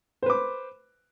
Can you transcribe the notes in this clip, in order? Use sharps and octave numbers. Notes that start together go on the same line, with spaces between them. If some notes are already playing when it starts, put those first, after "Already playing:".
B4 C5 D6